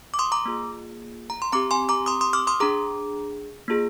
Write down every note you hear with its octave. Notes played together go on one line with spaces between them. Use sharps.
D6
C6 D#6
A#5 D6
A#3 F4 G#4
A#5
C6
C4 G4 A#5 D6
G#5 C6
A#5 D6
C6 D#6
C6 D#6
D6 F6
C6 D#6
D4 G#4 A#5 D6
A#3 F4 G#4